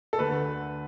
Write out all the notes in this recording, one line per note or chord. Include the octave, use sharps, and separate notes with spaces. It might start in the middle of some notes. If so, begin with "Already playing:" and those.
A4
D2 D3 A3 B4